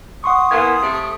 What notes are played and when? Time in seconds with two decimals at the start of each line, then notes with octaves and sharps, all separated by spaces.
0.24 F#5 C6 C#6 D#6
0.51 E3 A#3 B3 C6 G#6
0.82 C3 A3